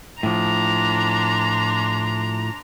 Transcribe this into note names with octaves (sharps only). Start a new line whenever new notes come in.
A2 F3 D4 A#5 C6